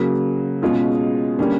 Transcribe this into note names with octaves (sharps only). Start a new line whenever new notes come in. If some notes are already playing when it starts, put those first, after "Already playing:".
Already playing: C#3 F#3 A#3
B2 G#3 C#4 F4 G#4
D3 G3 A#3 C#4